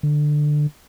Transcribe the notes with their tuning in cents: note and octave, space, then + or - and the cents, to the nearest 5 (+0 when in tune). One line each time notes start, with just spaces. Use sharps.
D3 +15